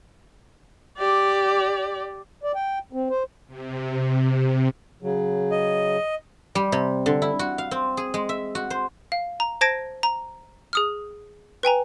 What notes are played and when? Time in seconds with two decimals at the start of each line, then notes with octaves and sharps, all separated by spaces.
0.98 G4 D5
2.43 D5
2.55 G5
2.93 C4
3.10 C5
3.48 C3
5.02 C#3 F#3
5.51 D#5
6.55 G3
6.72 C3
7.06 D3
7.22 E4
7.39 F#4
7.58 F5
7.71 C4
7.97 G#4
8.14 G#3
8.29 E5
8.55 F#4
8.70 C5
9.12 F5
9.40 A#5
9.61 C5 A5 G#6 A#6 D7
10.03 A#5
10.73 G#4 D#6 F6
11.63 B4 G5 G#5 A#5